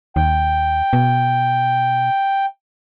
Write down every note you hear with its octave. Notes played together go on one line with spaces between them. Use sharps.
D#2 G5
B2